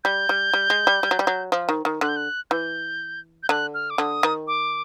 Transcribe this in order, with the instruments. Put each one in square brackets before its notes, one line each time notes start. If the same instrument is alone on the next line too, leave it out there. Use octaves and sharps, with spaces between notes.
[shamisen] G3 [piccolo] G6
[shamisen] G3
G3
G#3
G3
G3
F#3
G3
F#3
F3
D#3
D#3
[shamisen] D3 [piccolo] F#6
[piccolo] G6
F#6
[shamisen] E3 [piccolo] G6
[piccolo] G6
[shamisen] D3 [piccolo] F#6
[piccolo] F6
D6
[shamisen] D3 [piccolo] D#6
[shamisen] D#3
[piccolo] D6